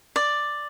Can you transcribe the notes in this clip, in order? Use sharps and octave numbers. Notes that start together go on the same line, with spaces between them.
D5